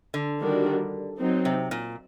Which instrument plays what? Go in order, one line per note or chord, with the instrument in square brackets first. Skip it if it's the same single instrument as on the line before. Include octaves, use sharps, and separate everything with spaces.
[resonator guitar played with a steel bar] D3
[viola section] D#3 G3 D4 F#4 A#4
F#3 C4 D#4
[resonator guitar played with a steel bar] C3
A#2